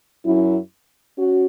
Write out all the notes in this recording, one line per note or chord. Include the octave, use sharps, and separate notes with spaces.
F#2 F#3 C#4 E4
C#4 F#4